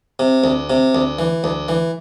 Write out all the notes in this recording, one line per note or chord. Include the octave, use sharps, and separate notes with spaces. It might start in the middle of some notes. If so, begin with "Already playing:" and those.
C3
D2
C3
D2
E3
D2
E3